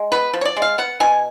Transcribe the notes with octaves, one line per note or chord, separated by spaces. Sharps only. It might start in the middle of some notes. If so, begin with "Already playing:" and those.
Already playing: G#3
B3 B4
F3
C#5
D5
G#3
F5
B3 F#5
B2 G#5